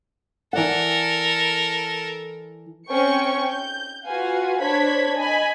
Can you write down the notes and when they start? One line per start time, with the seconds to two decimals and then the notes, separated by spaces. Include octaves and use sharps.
0.53 E3 A4 A#4 D5 F#5
2.88 C4 C#4 G5 C#6 C#7
3.48 G6
4.05 F4 F#4 B4 F5 F#5 G#5
4.60 D4 C5 C#5 B5 G#6 B6
5.17 D#5 G#5 B5